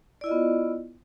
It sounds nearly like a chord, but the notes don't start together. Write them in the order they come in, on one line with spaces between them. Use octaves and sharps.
D5 E4 D#5 F4 B3